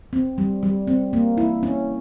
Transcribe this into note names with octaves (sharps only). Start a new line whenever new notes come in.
C4
G3
G3
C4
A#3
E4
C#4